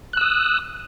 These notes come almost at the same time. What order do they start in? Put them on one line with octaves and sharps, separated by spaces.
F#6 E6 D#6